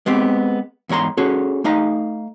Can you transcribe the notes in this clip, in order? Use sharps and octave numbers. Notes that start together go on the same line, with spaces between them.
G#3 B3 C4 G4
E2 G#2 C#5 A#5 C6
C#4 F#4 G#4 A4 C#5
A3 D#4 F5 A#5